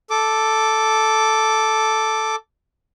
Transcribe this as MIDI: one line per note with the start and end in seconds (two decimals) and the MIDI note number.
0.10 2.36 69
0.10 2.36 86